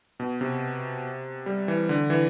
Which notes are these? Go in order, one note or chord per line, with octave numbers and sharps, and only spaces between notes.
B2
C3
G3
E3
D3
E3